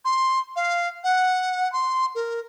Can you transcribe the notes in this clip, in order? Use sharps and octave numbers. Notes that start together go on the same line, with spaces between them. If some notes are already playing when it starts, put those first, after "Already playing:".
C6
F5
F#5
C6
A#4